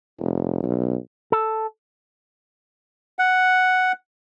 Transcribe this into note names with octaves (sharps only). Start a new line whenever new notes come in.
F1
B1
A4
F#5